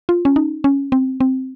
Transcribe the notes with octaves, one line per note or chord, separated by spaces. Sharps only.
F4
C#4
D#4
C#4
C4
C4